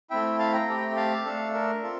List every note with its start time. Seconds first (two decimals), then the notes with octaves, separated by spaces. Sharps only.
0.10 A3 C4 E4 E5 G5
0.39 F5 A5
0.53 G5 A#5
0.68 A3 C4 G4
0.96 F5 A5
1.25 A3 D4 A4
1.53 A#4
1.83 C4 F4 A4